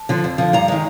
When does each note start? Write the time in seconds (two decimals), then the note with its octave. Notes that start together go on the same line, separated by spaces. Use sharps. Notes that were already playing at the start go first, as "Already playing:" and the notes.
Already playing: A5
0.09 D3 F3
0.24 F2
0.38 D3 F3
0.53 G2 A#5
0.68 D#3 G#3